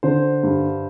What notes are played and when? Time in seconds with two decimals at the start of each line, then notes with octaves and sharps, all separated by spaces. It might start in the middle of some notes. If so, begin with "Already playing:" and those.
0.03 D3 C5
0.43 G2